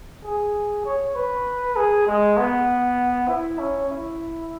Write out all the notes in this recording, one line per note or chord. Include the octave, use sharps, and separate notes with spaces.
G#4
C#5
B4
G#4
G#3
B3
E4
C#4
E4